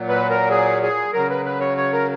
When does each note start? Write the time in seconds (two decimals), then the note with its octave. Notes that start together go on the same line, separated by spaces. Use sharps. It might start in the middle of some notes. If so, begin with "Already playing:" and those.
Already playing: A#2 F#3
0.09 B4
0.30 A#4
0.50 G#4
0.83 G#4
1.13 C#3 F#3 A#4
1.30 B4
1.45 B4
1.60 C#5
1.77 C#5
1.93 A#4